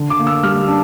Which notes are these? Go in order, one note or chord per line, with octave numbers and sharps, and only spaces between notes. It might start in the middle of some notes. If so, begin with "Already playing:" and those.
Already playing: D3
D6
A#3
E6
G3 F6
D4